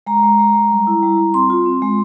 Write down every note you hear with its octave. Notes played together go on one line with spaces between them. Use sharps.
G#3 A#5
G#3
G#3
G#3
G3
E4
G3
G3
C4 C6
F4
C4
G#3